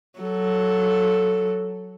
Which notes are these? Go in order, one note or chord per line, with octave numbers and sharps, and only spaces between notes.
F#3 A4